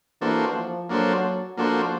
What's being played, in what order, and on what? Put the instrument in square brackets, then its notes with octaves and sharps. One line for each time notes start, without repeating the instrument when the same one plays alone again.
[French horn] E3 [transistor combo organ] A#3 D4 F#4 A4 C5
[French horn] F3
[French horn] F#3 [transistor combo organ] A#3 D4 F#4 A4 C5
[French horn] F3 [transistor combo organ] A#3 D4 F#4 A4 C5